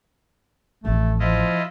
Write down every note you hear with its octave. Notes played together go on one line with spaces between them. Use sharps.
A1 F2 A3
F3 E4 F4 D#5